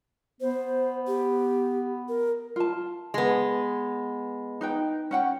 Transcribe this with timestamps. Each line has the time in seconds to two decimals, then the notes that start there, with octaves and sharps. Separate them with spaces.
0.41 B3 C5
1.07 G4
2.09 A#4
2.56 F4 A5
3.14 G#3 B3
4.61 D#4 B4 G5
5.11 C#4 F#5 G5